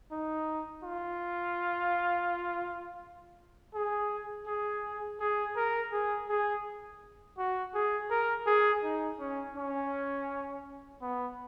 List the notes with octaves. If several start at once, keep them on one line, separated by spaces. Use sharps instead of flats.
D#4
F4
G#4
G#4
G#4
A#4
G#4
G#4
F#4
G#4
A#4
G#4
D#4
C#4
C#4
B3